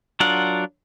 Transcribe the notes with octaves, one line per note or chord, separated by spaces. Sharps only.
F#3 D4 F4 A#4 F#5